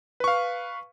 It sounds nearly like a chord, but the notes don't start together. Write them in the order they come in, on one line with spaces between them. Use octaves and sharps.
B4 C#6 F5